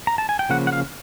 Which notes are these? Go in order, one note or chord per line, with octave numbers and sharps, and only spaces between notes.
A#5
A5
G#5
G5
C#3 F3 A#3 F#5
F#5
F5